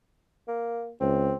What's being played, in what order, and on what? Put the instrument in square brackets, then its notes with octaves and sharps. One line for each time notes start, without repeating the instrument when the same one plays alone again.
[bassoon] A#3
[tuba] C#2 [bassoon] C4